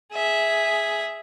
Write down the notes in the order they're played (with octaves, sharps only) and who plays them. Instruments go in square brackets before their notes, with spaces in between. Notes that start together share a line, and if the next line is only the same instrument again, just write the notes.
[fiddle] G#4 E5